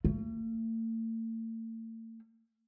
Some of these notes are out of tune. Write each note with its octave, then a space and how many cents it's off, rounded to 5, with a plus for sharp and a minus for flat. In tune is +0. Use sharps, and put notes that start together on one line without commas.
A3 +45